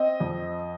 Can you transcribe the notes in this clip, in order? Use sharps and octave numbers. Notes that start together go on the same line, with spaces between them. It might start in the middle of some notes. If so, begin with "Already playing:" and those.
Already playing: C4 D#5
F2